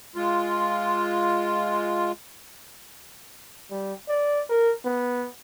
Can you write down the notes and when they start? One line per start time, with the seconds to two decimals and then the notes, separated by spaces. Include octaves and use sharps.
0.16 G#3 F4
3.71 G3
4.09 D5
4.50 A#4
4.86 B3